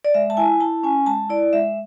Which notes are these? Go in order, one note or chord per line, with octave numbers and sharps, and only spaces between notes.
D5
G#3 E5
A5
E4 G#5
E4 A5
C#4 G#5
G#3 A5
E4 D5
G#3 E5